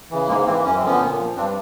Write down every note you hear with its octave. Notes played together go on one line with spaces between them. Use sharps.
C#3 E3
G#2 G#3 A#3
E3 A#3 C4
F#2 C#4
C4
D3 F3 B3 C#4
A#2
F3
G2 C4 D4